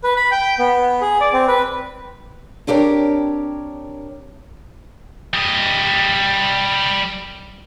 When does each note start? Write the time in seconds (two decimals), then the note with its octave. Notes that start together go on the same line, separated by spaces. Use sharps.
0.04 B4
0.17 B5
0.31 G5
0.59 B3
1.01 G#4
1.21 D5
1.33 C4
1.48 B4
2.67 C4 D4 G4 A#4 C#5
5.34 G3 D#5